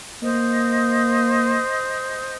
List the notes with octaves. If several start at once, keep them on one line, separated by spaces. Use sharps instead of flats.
A#3 C5 D#5 D#6